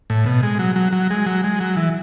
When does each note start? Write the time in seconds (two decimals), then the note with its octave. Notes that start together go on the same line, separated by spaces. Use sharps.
0.10 A2
0.26 B2
0.43 G#3
0.59 F#3
0.76 F#3
0.92 F#3
1.10 G#3
1.26 F#3
1.44 G#3
1.60 F#3
1.77 E3